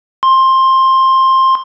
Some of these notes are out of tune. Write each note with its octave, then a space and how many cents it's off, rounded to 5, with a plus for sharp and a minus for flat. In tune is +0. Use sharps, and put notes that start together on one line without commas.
C6 +15